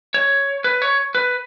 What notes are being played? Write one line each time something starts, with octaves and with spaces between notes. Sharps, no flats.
C#5
B4
C#5
B4